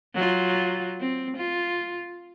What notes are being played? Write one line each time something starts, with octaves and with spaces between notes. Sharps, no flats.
F#3 F4
C4
F4